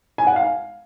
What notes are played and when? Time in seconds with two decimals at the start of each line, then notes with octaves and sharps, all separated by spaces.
0.18 G#5
0.27 F#5
0.36 F5